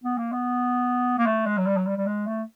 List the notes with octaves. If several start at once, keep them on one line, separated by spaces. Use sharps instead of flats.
B3
A#3
B3
A#3
A3
G#3
F#3
G3
F#3
G3
G3
G#3
A3